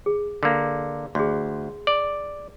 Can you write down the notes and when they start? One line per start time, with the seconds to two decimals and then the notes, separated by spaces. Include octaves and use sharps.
0.06 G#4
0.43 D3 A#3
1.15 D2 G#4 C6
1.87 D5